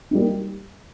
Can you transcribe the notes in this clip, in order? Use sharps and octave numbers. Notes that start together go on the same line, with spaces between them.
G3 A#3 D#4